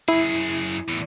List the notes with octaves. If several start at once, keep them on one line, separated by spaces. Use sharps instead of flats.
F#2 E4 G#4
E2 A2